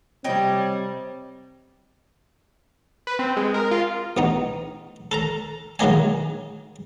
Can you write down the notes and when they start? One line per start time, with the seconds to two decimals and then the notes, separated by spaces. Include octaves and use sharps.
0.24 C3 G3 C4 C#5 D#5 G5
3.07 B4
3.19 C4
3.37 G#3
3.54 A#4
3.71 F4
4.17 A1 B3 D#4
5.11 A4 A#4 A#5
5.79 D#3 F#3 G#3 A#3 D#5 G#5